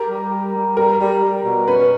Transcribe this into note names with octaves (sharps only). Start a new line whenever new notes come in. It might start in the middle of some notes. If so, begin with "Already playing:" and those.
Already playing: G4 A#4
G3
G4
G3
G3 A#4
G3
G3
B2
C#4 B4